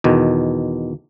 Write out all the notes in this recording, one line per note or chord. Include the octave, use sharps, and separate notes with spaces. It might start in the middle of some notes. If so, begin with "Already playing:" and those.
E2 B2 D#3